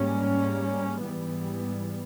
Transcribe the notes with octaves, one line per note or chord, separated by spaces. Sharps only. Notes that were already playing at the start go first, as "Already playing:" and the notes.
Already playing: G#2 G3 A#3 C#4
G#2 E3 G3 B3